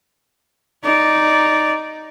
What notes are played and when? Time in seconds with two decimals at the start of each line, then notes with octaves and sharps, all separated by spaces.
0.84 D#4 D5